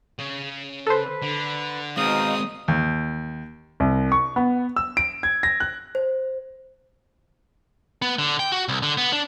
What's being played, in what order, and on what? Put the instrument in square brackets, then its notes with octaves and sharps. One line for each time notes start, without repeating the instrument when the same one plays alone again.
[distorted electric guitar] C#3
[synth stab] A4 C5 [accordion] B4
[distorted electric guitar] D3
[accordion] B2 D#4 F5 [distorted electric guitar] G#3 C4 [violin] D#6
[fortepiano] D#2
[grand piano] C2
C#6
B3
E6
D7
G#6
A#6
F#6
[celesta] C5
[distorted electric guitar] B3
D3
G5
F#4
C2
D3
B3
D4